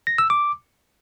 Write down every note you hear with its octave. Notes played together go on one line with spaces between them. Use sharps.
A#6
E6
D6